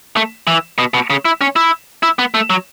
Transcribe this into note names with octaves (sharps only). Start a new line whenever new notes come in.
A3
E3
B2
B2
C#3
E4
C#4
E4
E4
B3
A3
F#3